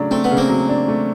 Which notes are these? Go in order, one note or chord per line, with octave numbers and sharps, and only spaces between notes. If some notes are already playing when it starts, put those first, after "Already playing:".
Already playing: C#3 F#3 A3 D4
A3 C4
B3
C#3
A#3 C4
F#3
D4
A3